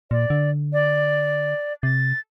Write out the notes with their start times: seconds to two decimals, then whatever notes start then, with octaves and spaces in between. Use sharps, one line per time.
0.11 A#2 D5
0.30 D3
0.73 D5
1.83 C3 A6